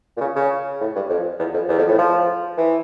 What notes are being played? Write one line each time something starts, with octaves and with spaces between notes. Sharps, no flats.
A#2
C#3
C#3
A2
G2
F2
E2
F2
E2
F2
A2
F3
E3